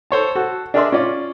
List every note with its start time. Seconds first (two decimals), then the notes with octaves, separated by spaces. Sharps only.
0.11 A4 C5 C#5 A5
0.35 F#4 A4
0.74 D4 G#4 A#4 D5 E5 C6
0.92 C#4 F4 D5